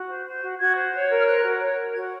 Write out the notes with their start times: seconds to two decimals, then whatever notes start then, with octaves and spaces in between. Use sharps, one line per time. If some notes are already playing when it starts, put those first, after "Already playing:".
Already playing: F#4
0.08 C5
0.26 C5
0.43 F#4
0.60 F#4 G#6
0.76 C5
0.94 C#5
1.11 A#4
1.20 F6
1.27 C5 F#6
1.43 F#4
1.61 C#5
1.78 A#4
1.94 F#4 G#6